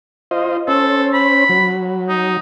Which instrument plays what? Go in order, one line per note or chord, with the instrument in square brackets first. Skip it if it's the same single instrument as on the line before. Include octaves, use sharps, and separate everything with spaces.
[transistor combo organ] F4 C5 D#5
[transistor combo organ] C#4 C5 [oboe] A4
[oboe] B5
[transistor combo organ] F#3
[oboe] D#4